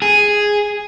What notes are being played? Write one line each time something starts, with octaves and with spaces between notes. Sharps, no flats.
G#4